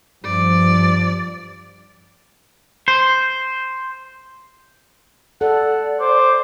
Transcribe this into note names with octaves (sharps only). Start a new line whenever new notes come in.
G2 F3 D5
C5
A4 D5 F#5
C5 D6